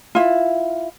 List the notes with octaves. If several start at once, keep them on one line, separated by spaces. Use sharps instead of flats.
E4 F4